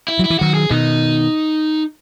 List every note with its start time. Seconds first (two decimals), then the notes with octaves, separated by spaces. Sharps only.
0.08 E4
0.19 F#3
0.25 E4
0.30 E3
0.39 D#3 F#3 F#4
0.54 G#4
0.71 B2 D#3 D#4